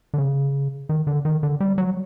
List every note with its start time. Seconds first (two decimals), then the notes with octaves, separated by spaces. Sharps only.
0.14 D3
0.18 C#3
0.89 D#3
1.07 D3
1.25 D#3
1.43 D3
1.60 G3
1.78 F#3